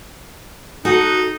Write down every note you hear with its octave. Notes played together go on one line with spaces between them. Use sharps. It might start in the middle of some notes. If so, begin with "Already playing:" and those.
D#4 F#4 A4 F#5